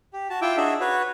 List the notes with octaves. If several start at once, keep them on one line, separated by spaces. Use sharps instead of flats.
G4
F#4 A5
E4 F4 E5 G5 D6
D4 D#4 F#4 G#4 E5
F#4 B4 C#5